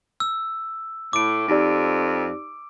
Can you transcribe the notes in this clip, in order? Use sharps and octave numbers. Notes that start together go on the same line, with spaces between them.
E6
A2 D6 D7
F2 D#4 G4 D5